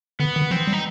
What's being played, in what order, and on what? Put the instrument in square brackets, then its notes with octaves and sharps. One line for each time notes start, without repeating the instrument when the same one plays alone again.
[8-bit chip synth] D3 [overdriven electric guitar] B3
[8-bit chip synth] D#3
[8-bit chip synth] F3 [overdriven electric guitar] C4
[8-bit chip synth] G3
[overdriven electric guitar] D#4